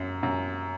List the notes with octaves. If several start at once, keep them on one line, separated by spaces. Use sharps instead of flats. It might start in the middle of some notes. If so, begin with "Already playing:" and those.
Already playing: F#2
F#2